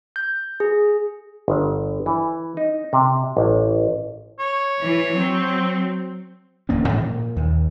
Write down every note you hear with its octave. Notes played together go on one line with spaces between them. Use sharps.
G6
G#4
G1
E3
D#4
C3
A1
C#5
E3
F#3 C4
D1 E2 A#3 C#4
G#2 E3
A#2
D#2